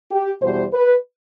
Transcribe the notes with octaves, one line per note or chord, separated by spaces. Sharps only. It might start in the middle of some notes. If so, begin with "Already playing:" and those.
G4
E2 B2 G3 C5
B4